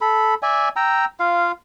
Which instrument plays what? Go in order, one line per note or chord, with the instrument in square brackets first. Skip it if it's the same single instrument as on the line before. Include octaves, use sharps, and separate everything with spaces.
[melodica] A4 B5
D5 E5 G#5
G5 A#5 E6
F4 F5